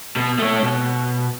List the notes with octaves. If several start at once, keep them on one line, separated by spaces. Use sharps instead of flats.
B2
A3 C#5
B2